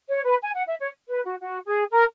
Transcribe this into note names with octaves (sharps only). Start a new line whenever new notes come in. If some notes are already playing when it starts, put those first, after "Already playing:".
C#5
B4
G#5
F#5
E5
C#5
B4
F#4
F#4
G#4
A#4